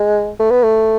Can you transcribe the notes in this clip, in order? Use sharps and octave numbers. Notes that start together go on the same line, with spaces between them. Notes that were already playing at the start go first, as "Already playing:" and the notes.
Already playing: G#3
A3
B3
A3